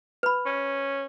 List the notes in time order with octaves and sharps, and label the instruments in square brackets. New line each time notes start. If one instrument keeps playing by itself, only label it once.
[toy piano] B4 B5
[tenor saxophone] C#4